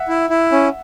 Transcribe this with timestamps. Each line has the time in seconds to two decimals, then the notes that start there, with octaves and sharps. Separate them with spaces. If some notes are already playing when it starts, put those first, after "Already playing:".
Already playing: E5 F#5
0.08 E4
0.30 E4
0.52 C#4